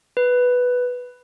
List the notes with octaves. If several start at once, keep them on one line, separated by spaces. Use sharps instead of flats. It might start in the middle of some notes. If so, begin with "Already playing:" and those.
B4